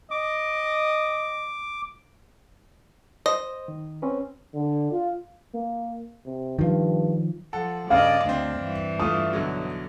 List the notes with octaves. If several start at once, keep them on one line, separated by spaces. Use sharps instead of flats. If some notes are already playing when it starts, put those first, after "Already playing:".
D#5 D6
C5 D#5
D#3
C4 C#4 B4
D3
F4
A#3
C3
G2 D#3 F3
F3 A4 F#5
G2 C#3 D5 D#5 F5
D2 C4 D4
G2 E3
A3 D4 F4 D#6
B1 D3 F#3